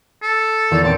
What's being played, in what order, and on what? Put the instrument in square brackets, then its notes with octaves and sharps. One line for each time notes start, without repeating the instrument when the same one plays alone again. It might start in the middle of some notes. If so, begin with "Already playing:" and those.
[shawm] A4
[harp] E2 D#3
[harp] D#1 C4 D7 [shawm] A5